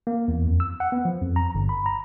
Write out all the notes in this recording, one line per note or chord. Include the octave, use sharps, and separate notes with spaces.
A#3
E2
F2
E6
F#5
B3
F3
F2
A#5
G1
B5
A#5